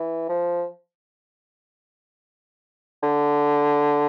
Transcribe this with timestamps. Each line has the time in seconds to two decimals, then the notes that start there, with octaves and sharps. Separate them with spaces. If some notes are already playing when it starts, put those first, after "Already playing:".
Already playing: E3
0.29 F3
3.03 D3